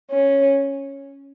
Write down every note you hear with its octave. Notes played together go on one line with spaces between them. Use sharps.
C#4